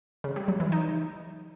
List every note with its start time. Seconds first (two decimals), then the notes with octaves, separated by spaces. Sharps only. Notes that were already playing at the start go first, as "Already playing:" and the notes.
0.24 C#3
0.36 G3
0.48 F#3
0.60 E3
0.72 D#4